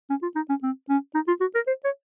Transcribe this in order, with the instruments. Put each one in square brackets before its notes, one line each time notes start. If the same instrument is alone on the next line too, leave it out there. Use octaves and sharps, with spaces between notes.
[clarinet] C#4
F4
D#4
C#4
C4
C#4
D#4
F4
F#4
A#4
C5
C#5